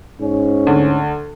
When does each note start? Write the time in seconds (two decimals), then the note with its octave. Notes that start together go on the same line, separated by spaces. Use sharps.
0.20 G#2 C#4
0.67 D2